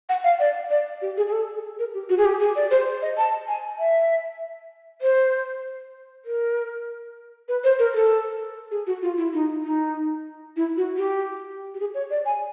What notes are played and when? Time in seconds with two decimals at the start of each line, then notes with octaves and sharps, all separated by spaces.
0.09 F#5
0.24 F5
0.40 D5
0.71 D5
1.02 G4
1.17 G#4
1.27 G#4
1.33 A4
1.79 A#4
1.94 G4
2.09 F#4
2.18 G#4
2.25 G4
2.40 G#4
2.56 D5
2.71 C5
3.02 D#5
3.18 A5
3.48 G#5
3.78 E5
5.02 C5
6.25 A#4
7.48 B4
7.64 C5
7.79 A#4
7.94 A4
8.71 G#4
8.87 F#4
9.02 F4
9.17 E4
9.33 D#4
9.64 D#4
10.56 E4
10.77 F#4
10.97 G4
11.74 G4
11.80 G#4
11.94 C#5
12.11 D5
12.26 G#5